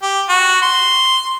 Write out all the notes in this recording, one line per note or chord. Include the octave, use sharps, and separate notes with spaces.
G4
F#4
C6